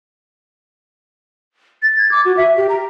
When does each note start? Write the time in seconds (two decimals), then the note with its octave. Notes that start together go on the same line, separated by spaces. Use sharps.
1.82 A6
1.98 G#6
2.11 D6
2.25 F#4
2.37 E5
2.57 G4
2.69 A#5